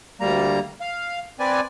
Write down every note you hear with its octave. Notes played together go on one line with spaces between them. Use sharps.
D2 G3 A#3 A#5
F5
C4 B4 D5 G#5